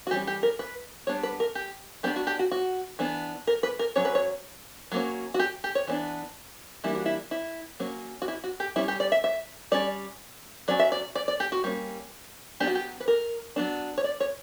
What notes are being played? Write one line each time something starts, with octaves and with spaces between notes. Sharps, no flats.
F#4
E3 G3 C#4 G4
G4
A#4
B4
G3 B3 D4 C#5
B4
A#4
G4
F#3 B3 D4 G4
F#4
G4
F#4
F#4
E3 B3 D4
A#4
B4
A#4
F#3 C#4 C#5
B4
C#5
F#3 A#3 C#4
F#4
G4
G4
C#5
E3 B3 D4
E3 G3 A#3 D4 E4
F#4
E4
E4
F#3 A#3 C#4
F#4
E4
F#4
G4
G3 C#4 E4
G4
D5
E5
E5
G3 C#4 D5
F#3 C#4 D5
E5
D5
D5
D5
G4
F#4
G3 A#3 C#4
F#3 B3 D4 G4
F#4
G4
B4
A#4
F#3 B3 D4
C#5
D5
C#5